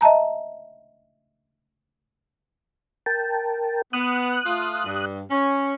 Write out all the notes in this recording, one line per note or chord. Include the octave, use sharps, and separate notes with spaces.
D#5 E5 A5 A#5
A#4 G5 A5
B3 D#6 F#6
A3 F4
G2
C#4